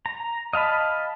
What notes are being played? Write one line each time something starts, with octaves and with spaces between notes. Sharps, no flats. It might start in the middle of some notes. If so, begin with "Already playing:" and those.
A#5
D#5 F5 A5 B5